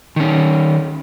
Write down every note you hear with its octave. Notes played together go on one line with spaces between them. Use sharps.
D#3 C#4